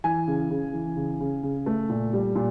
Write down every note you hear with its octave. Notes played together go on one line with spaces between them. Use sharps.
E3 G#5
C#3
C#3
E3
C#3
C#3
C#3
A3
A#2
G3
A#2